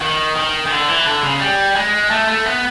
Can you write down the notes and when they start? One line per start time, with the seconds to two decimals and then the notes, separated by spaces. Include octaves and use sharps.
0.01 D#3
0.35 D#3
0.67 D#3
0.71 D3
0.88 E3
1.06 D3
1.23 C#3
1.40 G3
1.75 G#3
2.10 A3
2.28 A3
2.45 B3